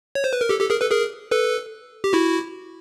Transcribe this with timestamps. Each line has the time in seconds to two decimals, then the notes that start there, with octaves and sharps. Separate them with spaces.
0.15 C#5
0.24 C5
0.33 B4
0.41 A#4
0.49 G4 A4
0.60 G4 A4
0.70 G#4 A#4
0.81 A4 B4
0.91 G#4 A#4
1.31 A4 B4
2.04 G4
2.13 E4 F#4